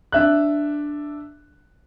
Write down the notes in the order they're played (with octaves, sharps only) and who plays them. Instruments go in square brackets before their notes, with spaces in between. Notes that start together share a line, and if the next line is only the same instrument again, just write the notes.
[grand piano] D4 E5 F#6